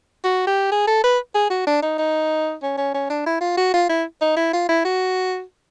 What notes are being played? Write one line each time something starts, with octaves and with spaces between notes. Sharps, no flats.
F#4
G4
G#4
A4
B4
G#4
F#4
D4
D#4
D#4
C#4
C#4
C#4
D4
E4
F4
F#4
F4
E4
D#4
E4
F4
E4
F#4